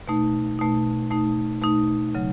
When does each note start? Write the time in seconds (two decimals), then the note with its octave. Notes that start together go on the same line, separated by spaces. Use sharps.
0.08 B2 A3 D#4
0.59 B2 A3 D#4
1.10 B2 A3 D#4
1.61 B2 A3 D#4
2.15 C#3 F#3